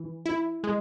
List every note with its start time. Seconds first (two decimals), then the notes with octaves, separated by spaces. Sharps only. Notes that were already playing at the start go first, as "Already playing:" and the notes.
Already playing: E3
0.26 E4
0.64 G#3